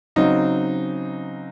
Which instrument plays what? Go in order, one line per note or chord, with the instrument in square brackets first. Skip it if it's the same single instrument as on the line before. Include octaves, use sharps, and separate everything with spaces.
[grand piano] C#3 F#3 C4 D#4